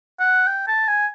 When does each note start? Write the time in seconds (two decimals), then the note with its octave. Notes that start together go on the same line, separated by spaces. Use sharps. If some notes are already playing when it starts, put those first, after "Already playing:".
0.20 F#5
0.47 G5
0.67 A5
0.88 G#5